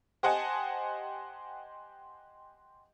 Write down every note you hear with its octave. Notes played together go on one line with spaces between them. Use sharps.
G4 C5 D#5 F#5 G#5 A5